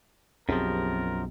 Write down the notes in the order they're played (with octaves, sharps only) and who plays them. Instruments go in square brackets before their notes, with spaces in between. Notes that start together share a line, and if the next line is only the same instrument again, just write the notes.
[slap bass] B1 [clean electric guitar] F#2 F3 [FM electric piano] C4 G4 G#4 [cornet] A#4